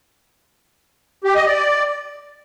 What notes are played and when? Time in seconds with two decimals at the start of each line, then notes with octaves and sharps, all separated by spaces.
1.24 G4
1.35 D#5
1.46 D5